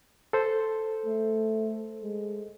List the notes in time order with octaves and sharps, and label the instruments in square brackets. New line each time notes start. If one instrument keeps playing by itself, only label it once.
[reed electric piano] A4 C5
[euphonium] A3
G#3